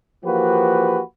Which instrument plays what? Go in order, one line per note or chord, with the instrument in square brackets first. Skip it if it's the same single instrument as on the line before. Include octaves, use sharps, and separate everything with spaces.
[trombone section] E3 F3 A#3 F#4 G4 B4